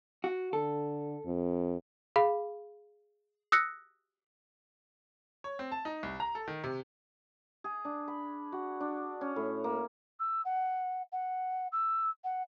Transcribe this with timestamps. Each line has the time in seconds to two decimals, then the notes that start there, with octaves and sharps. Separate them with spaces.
0.24 F#4
0.53 D3 A4
1.25 F2
2.16 G#4 F5 B5
3.52 D#6 E6 F#6 A#6 C#7
5.44 C#5
5.59 C4
5.72 A5
5.85 D#4
6.03 C2
6.20 A#5
6.35 A4
6.48 D#3
6.64 C3
7.64 G#4
7.85 D4
8.08 B5
8.52 F#4
8.80 D4
9.21 C#4
9.36 A2
9.64 A#3
10.19 E6
10.45 F#5
11.12 F#5
11.72 E6
12.24 F#5